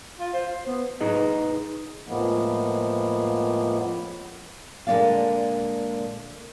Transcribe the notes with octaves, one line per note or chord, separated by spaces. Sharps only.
F4
C5
B3
D#4 G#4 B4 D#5
F2 A2 F3 G#3 A#3 B3
A#2 D3 G#3 D4 D5 F5